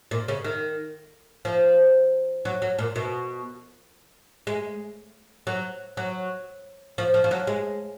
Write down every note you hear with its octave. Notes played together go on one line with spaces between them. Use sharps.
A#2
C#3
D#3
F3
F#3
F#3
A#2
B2
G#3
F#3
F#3
F3
F3
F3
F#3
G#3